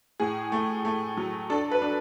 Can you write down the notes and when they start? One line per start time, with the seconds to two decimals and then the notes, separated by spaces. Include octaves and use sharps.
0.20 A2 G#4
0.52 A3
0.85 A3
1.17 F#3
1.50 D4 A4
1.71 B4
1.82 D4